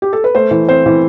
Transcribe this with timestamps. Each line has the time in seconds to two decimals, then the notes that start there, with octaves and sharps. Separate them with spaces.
0.02 G4
0.13 A4
0.24 B4
0.35 A3 C5
0.51 E3
0.69 C4 C5
0.86 E3